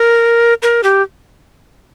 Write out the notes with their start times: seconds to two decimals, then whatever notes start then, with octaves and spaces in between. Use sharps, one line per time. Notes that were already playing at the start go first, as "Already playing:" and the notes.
Already playing: A#4
0.63 A#4
0.83 G4